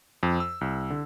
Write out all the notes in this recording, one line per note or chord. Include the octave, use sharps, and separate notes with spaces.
F2
E6
C2
D3